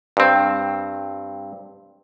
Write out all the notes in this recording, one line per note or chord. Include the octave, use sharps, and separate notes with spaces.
G2 C4